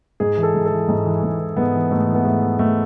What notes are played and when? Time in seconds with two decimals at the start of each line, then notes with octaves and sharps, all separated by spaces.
0.20 G#2 G#4
0.37 E3
0.43 A4
0.54 G#2
0.66 A4
0.71 E3
0.88 G#2
1.06 E3
1.23 G#2
1.40 E3
1.57 G#2 B3
1.74 E3
1.91 G#2 A3
2.08 E3
2.15 B3
2.25 G#2 A3
2.42 E3
2.59 G#2 A3